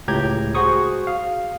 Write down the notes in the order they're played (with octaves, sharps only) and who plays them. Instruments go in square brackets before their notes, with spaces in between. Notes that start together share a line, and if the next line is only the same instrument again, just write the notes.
[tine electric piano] C#2 A2 G4 A#5 G6 G#6
F#4 G#4 C5 C#6 D#6
F5